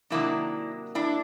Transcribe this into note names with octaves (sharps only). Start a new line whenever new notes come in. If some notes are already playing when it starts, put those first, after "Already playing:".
C3 D#3 F#3 A#3 D4 E4
D4 E4